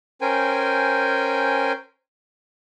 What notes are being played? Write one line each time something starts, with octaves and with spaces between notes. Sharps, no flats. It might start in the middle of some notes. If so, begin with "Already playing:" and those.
C#4 A#4 C5 G5 G#5